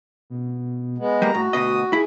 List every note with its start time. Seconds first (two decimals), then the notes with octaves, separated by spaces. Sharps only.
0.30 B2
0.98 G#3 B3
1.22 G3 A#3 A#5
1.34 A2 F#4
1.53 D2 B2 D#5 D#6
1.93 E4 G#4